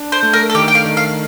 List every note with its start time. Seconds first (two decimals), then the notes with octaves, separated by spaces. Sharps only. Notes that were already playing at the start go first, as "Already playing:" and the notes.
Already playing: D4
0.12 C5
0.23 A3
0.33 A#4
0.50 A4
0.55 D#3 G4
0.68 G5
0.75 F5
0.86 D#3
0.97 F5